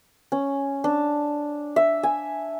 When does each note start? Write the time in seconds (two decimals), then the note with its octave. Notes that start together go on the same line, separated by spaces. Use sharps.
0.32 C#4
0.84 D4
1.76 E5
2.03 G#5